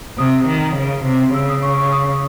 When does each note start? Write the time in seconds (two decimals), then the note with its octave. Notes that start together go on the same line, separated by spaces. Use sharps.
0.18 C3 D#6
0.47 D#3
0.77 C#3
1.05 C3
1.34 C#3 E6
1.49 D#6
1.63 C#6
1.78 C#6
1.92 D#6